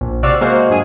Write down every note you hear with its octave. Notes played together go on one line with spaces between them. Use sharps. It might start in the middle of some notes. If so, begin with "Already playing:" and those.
A#1
C3 F#4 D5 F5 E6 D7
G#3 A#3 F#4 C5 F5
G2 F#3 G#4 D#7 E7